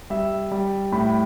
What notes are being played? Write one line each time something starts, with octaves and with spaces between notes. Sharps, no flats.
G3 E5
G3
A2 B5